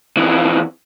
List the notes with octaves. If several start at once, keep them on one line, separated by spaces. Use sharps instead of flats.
F2 E3